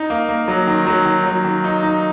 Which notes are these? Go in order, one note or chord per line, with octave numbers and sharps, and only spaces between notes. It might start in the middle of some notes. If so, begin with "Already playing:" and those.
Already playing: D#4
A#3
A#3
F#3
D#3
F#3
D#3
F#3
D#3
D#4
D#4